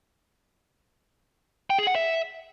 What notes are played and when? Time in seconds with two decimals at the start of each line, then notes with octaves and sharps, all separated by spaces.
1.70 G5
1.78 G#4
1.87 F#5
1.95 E5